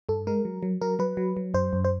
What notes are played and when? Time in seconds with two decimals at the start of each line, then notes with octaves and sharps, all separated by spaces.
0.09 G2 A4
0.27 G#3 A#4
0.45 F#3
0.63 F#3
0.81 F#3 A#4
0.99 F#3 B4
1.17 F#3
1.37 F#3
1.54 F#2 C5
1.73 F#2
1.85 C5